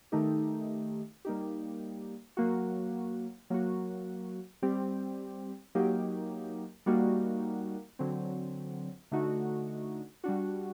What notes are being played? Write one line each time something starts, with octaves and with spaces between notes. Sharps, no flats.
D#3 A3 D#4 G4
G3 A#3 D#4 G4
F#3 A#3 F#4
F#3 A#3 F#4
G3 C4 G4
F#3 A#3 D#4 G4
G3 A#3 D#4 F#4
D3 F#3 C4
D3 A3 D#4 F#4
G3 D4 F#4